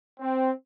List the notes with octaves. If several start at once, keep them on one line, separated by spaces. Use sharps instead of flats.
C4